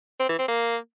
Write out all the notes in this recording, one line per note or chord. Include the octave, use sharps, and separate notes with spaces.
C4
E3
C4
A#3